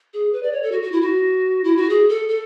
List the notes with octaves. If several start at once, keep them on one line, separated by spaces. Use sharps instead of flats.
G#4
B4
D5
C#5
A4
F#4
F#4
E4
F#4
E4
F#4
G#4
A4
A4